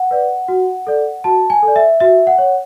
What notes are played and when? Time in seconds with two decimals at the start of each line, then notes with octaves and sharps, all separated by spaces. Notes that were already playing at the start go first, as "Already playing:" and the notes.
Already playing: F#5
0.11 B4 D5
0.48 F#4
0.87 A4 D5
1.24 F#4 A5
1.50 G#5
1.63 A4
1.68 D5
1.76 E5
2.00 F#4 E5
2.27 F#5
2.38 C#5